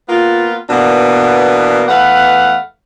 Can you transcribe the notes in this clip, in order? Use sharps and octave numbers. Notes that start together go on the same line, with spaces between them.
A#3 B3 F4
B2 E3 A#3 B3 D4
E2 A3 B4 F5 F#5